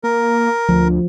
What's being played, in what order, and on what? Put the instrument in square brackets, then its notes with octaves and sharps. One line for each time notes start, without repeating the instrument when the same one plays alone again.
[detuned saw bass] A#3 [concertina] A#4
[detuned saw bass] D2 [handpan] F3